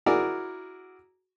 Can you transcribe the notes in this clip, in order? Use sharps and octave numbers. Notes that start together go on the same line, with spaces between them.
E4 F#4 G#4 A#4 D5